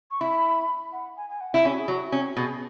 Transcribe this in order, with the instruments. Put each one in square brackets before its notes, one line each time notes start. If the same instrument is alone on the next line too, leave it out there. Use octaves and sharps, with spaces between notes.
[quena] C#6
[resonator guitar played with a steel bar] E4 [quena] B5
[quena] F#5
G#5
G#5
F#5
[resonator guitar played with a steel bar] E4
[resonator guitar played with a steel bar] C#4 [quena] G#4
[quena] F#4
G#4
[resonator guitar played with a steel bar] F#3 [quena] F#4
[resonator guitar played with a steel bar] C#4 [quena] F#4
[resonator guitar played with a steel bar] B2 [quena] G#4